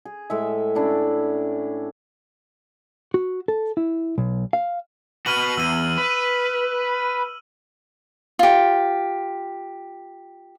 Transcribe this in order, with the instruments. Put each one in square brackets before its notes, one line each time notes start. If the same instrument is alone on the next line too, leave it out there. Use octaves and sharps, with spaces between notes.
[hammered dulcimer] G#4
A2 G#3 E5
C#4 D4 E4
[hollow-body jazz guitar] F#4
A4
E4
B1
F5
[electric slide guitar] F#4 B4 [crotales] F6 D#7 F#7
[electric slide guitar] E2 [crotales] E6 D#7
[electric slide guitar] B4
[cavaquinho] F4 G4